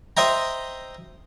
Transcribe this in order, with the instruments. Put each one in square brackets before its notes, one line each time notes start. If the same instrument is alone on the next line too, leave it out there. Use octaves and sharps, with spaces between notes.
[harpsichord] C5 D#5 E5 G5 A#5